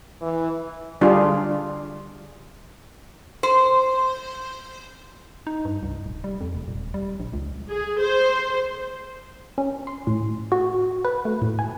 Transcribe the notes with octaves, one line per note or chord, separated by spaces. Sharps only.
E3
D3 G3 D4 F4 G#4
C5
D#4
G2
C2
D1
G3
F2
F1
D#1
G3
A#1
C#2
G#4
C5
C#4
C6
A2
F#4
B4
A3
A2
G#5